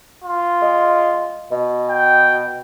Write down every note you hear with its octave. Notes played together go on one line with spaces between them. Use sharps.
F4
G#3
B2
G5